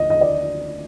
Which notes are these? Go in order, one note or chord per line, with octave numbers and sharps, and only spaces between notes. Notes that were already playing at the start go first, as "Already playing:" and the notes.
Already playing: D2 D#5
D#5
D5